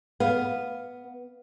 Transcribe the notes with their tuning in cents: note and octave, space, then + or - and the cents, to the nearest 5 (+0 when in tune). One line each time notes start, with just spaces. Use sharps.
B3 +0 F5 +0